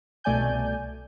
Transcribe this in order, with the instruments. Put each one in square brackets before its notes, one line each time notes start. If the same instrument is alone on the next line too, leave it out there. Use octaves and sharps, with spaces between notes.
[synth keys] C2 B2 A3 D5 G#5 G6